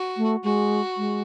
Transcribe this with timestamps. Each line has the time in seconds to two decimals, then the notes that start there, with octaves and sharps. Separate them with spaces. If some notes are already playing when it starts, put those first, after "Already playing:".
Already playing: F#4
0.17 A3
0.43 G#3 F#4
0.97 G#3